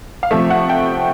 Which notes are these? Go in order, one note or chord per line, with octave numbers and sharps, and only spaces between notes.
F5
C3 F3 A3 E5
F#5
G5